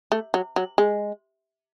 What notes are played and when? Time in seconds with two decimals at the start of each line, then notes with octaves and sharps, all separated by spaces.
0.12 A3
0.34 F#3
0.56 F#3
0.78 G#3